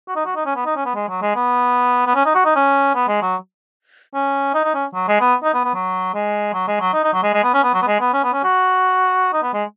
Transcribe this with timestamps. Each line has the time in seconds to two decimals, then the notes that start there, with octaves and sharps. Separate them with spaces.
0.08 F#4
0.16 D#4
0.26 F#4
0.36 D#4
0.46 C#4
0.56 B3
0.66 D#4
0.76 C#4
0.85 B3
0.95 G#3
1.09 F#3
1.22 G#3
1.36 B3
2.06 B3
2.15 C#4
2.25 D#4
2.35 F#4
2.45 D#4
2.56 C#4
2.95 B3
3.08 G#3
3.22 F#3
4.14 C#4
4.54 D#4
4.64 D#4
4.75 C#4
4.94 F#3
5.08 G#3
5.21 B3
5.44 D#4
5.54 B3
5.65 B3
5.74 F#3
6.14 G#3
6.54 F#3
6.68 G#3
6.80 F#3
6.94 D#4
7.04 D#4
7.14 F#3
7.23 G#3
7.34 G#3
7.44 B3
7.54 C#4
7.63 B3
7.74 F#3
7.82 B3
7.87 G#3
8.00 B3
8.13 C#4
8.24 B3
8.33 C#4
8.44 F#4
9.33 D#4
9.43 B3
9.54 G#3